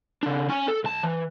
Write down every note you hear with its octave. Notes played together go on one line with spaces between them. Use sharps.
C#3 D4
C#4 G#5
A4
B1 A5
E3